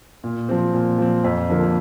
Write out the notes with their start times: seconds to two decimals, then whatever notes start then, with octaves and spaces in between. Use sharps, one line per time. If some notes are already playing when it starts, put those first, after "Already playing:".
0.24 A#2
0.49 F3 C4
0.74 A#2
0.98 F3 C4
1.24 F2
1.49 D3 F3 A#3